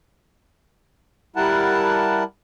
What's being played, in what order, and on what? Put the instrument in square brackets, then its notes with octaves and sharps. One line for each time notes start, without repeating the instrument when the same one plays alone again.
[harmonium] G3 E4 A#4 F#5 A5